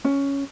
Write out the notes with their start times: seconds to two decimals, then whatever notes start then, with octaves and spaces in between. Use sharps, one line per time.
0.05 C#4